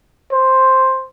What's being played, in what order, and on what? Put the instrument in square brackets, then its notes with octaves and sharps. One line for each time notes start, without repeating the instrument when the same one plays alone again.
[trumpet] C5